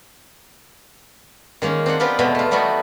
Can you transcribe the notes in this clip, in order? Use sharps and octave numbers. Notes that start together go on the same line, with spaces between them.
D#3 G#3 A#3 C#4
C4 D4 G#4 F#5
B3 C4 F4 G4 B4
E2 B2 G#3 A3 G5
A3 F4
E3 G3 A3 B3 D#4 F#4